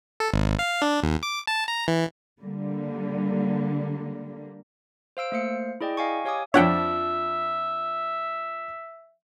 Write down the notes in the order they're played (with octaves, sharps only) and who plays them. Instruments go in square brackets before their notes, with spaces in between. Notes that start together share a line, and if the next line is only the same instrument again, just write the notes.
[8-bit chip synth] A4
G#1
F5
D4
D#2
D6
A5
A#5
E3
[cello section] D3 G3 A#3
[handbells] C5 F5 E6 D7
A3 A#3 C5 F5 C#7
E4 G#4 D5 D#5 G5
D#5 F5 G#5 C#6
G4 C#5 F5 G#5 D6 D#6
[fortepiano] F2 F3 D4 [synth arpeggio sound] C#5 F#5 G5 [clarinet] E5